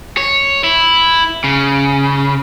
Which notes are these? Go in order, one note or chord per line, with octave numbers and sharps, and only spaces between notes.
C#5
E4
C#3